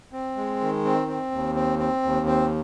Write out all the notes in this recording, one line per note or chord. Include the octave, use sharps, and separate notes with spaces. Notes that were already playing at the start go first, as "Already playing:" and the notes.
C4
G#3
D#3
C4
C4
D#2
C4
C4
D#2
C4